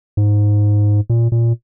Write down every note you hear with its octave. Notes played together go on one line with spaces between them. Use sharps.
G#2
A#2
A#2